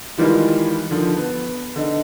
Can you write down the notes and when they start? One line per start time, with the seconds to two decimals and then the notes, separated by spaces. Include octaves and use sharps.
0.17 D#3 E3 G3 G#3 F4
0.91 D3 D#3 F3
1.16 B3
1.76 D3 D#4